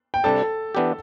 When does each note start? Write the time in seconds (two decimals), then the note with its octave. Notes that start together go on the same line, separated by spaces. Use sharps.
0.14 G5
0.24 C3 G3 D4 A4 A5
0.75 E3 B3 D4 G4